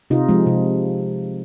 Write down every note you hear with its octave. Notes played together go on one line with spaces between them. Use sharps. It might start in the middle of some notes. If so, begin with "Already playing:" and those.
C3 D#4 F4
F3 G#3
C3